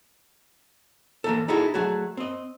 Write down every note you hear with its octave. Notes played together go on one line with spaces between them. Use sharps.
E3 A#3 A4
D#4 E4 F#4 G#4 A4
F#3 A3 F#4 G#4
C4 D#5